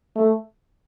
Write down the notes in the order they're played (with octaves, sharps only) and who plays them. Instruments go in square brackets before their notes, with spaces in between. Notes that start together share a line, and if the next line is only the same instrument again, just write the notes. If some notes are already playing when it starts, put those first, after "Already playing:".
[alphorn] A3